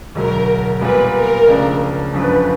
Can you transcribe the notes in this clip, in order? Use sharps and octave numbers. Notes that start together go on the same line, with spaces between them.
E1 D2 D3 F#3 A#4
A#2 G3 B3 B4
A#4
C#2 C#3 F3 A3 D4
G1 F#2 D3 F3 B4